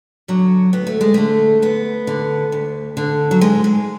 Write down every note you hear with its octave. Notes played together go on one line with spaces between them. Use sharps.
D3 F#3
D2 B3
A3
G#3
D3 A3
D2 B3
D3
D2
D3
F#3
G#2 G#3
G#3